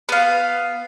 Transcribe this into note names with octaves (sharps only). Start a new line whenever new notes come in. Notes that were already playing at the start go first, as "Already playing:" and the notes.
B3 F5